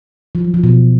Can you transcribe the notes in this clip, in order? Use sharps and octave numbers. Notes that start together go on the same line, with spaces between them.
F3
F#3
F3
B2